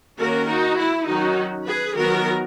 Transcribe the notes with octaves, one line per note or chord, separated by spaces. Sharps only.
D#3 A#3 C#4 F#4 A#4
D#4 F#4
E4
D#3 F#3 C#4 D#4 F#4
G#4 B4
D#3 F#3 B3 F#4 A#4